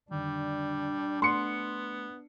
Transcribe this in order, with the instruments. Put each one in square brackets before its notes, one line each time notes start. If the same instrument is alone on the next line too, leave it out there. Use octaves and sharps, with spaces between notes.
[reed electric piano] F2 D3 D#3 [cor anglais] G3 [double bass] D4
[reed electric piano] A3 F#5 [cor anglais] B3 [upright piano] C6 C#7